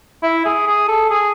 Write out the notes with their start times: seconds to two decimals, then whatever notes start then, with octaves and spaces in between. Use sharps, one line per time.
0.23 E4
0.45 G#4
0.67 G#4
0.88 A4
1.10 G#4